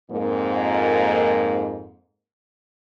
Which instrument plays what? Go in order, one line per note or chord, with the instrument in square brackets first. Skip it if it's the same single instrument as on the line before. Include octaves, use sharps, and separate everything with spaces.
[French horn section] F2 G#2 A#3